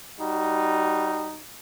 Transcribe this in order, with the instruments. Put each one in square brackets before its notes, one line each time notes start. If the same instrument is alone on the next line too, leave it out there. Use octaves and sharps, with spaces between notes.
[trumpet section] G3 D#4 F#4